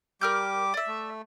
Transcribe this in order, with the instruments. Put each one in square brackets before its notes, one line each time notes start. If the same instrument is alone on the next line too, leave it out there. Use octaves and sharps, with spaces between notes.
[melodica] G3 G4 D6 [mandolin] A#4 F6 G6
[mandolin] D5 E5
[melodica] A3